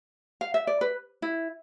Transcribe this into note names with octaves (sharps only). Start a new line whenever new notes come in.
F5
E5
D5
B4
E4